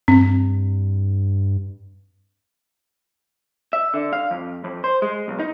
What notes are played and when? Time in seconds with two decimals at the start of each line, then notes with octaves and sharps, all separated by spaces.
0.08 G2 C4
3.73 E5
3.94 D3
4.13 F5
4.31 F2
4.64 F2
4.84 C5
5.02 G#3
5.28 B1
5.40 D#4